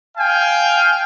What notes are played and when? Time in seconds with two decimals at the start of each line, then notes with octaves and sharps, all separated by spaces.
0.17 F5 G5 G#5